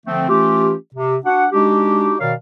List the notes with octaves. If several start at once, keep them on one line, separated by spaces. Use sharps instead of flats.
D3 F3 A3 C4
E3 A3 C#4 F4 G4
C3
D4 F#4 F#5
G#3 D4 D#4 F#4 G4
B2 D#3 A#4 C#5 D5 F5